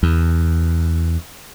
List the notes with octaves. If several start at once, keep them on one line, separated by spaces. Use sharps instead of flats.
E2